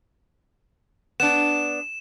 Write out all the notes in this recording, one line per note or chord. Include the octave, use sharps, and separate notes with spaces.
B3 D4 E7